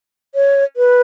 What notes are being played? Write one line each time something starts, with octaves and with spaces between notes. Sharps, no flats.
C#5
B4